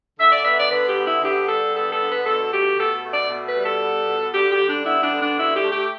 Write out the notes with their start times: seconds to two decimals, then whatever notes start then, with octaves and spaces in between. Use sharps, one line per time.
0.19 D3 E5
0.32 D5
0.45 B3 E5
0.57 D5
0.71 D3 B4
0.88 G4
0.97 B3
1.05 E4
1.22 D3 G4
1.48 G3 A4
1.74 B3 A4
1.92 A4
2.00 D3
2.09 B4
2.26 B2 A4
2.52 A3 G4
2.77 B2 A4
3.03 A3
3.12 D5
3.30 B2
3.47 B4
3.55 G3
3.64 A4
3.81 B3
4.07 B2
4.33 D3 G4
4.51 G4
4.59 G3
4.68 D4
4.85 B3 E4
5.02 D4
5.11 D3
5.19 D4
5.36 B2 E4
5.54 G4
5.62 A3
5.71 G4